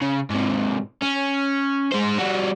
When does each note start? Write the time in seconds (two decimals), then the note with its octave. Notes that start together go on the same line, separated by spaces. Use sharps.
0.02 C#3
0.30 G#2 C3
1.02 C#4
1.92 G#3 C5
2.18 G3 F#4